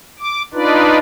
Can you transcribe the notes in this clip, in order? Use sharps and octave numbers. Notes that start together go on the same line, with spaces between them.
D6
D4 D#4 F4 B4 D5